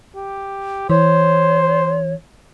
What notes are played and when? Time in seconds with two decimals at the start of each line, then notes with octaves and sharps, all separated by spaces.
0.15 G4
0.90 E3 C5 C#5